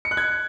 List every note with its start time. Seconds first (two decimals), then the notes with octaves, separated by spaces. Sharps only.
0.05 C#7
0.11 F#6
0.17 G#6